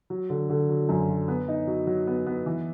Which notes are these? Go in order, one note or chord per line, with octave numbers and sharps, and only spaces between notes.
F#3
D3
D3
F#3
F#2
F#3
B3
D#4
F#3
F#3
B3
B3
E3